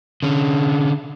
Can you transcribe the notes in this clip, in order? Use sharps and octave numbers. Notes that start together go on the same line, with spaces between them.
D3 C#4